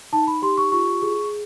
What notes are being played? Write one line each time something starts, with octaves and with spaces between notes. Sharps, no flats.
D#4 A5
B5
G4 C6
C#6
F4 C#6
G#4